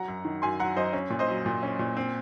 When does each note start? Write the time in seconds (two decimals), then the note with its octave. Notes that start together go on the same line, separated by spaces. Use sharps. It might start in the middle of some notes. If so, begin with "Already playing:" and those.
Already playing: F#3 F#5 A#5
0.08 F#2
0.25 D#3
0.42 F#2 G#5 C6
0.60 F#3 F#5 A#5
0.76 F#2 C5 D#5
0.93 C#4
1.10 A#2
1.19 C5 D#5
1.29 F#3
1.46 A#2
1.63 C#4
1.79 A#2
1.97 C4